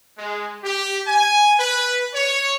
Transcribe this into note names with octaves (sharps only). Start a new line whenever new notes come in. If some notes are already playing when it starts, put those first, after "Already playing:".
G#3
G4
G#5
B4
C#5